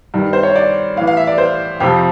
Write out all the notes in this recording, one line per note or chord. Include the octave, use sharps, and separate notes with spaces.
G2 D#3
C5
C#5
D5
A2 E3 F5
F5
E5
D5
C5
F2 C3 F3 G4